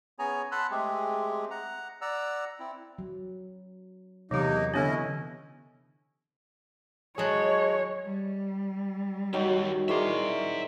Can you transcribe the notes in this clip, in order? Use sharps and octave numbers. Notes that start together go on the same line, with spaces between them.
B3 C#4 G#4 C#5 G#5 A#5
F#5 A5 B5 C6 E6 F#6
G#3 A3 C4 G4 G#4
F#5 A#5
D5 F#5 A#5 E6
C4 E4
F#3
E2 C3 E3 F#3 A#3 D#4 G4
D3 B3 C#4 D4 E4 D#5
F#3 G#3 G#4 C#5 A5 F#6
G3
D#3 F#3 D#4 G4
D#3 E4 G#4 A#4 C#5 D5 E5 C6